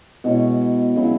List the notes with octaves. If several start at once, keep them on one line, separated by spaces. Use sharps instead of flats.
B2 G#3 E4 C#5
C#3 F#3 E4 G#4